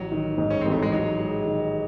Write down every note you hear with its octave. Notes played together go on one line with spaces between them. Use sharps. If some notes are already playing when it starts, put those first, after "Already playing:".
Already playing: A1 F#3
D#3
G#2
C#4
A1 C4
A3
G#3
F#3 D#4
G#3
D#3